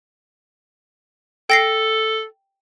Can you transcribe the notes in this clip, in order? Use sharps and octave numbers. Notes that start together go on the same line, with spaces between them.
A4 G5 A#6 C7